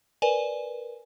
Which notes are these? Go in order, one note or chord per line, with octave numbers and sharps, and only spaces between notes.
A#4 B4 D5 G#5